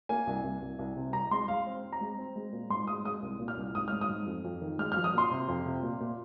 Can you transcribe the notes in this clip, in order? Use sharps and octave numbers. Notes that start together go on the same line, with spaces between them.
A#3 G#5
C2
C2
C2
C2
C3
C2 A#5
G#3 C6
G#3 F5
C4
C4
A#5
G#3
C4
G#3
A#2
G#2 C6
G#3 D#6
G#3 D#6
C2
A#2
F6
C2
G#2 D#6
G#2 F6
D#6
G#2
F2
F2
D#3
G#3 F6
F3 F6
D#6
A#2 C6
C3
F2
C3
A#2
A#2